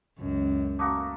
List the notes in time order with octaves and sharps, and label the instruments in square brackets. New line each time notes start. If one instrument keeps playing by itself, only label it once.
[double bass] C#2 [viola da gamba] F#2
[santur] A3 A#3 F#4 [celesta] D6 D#6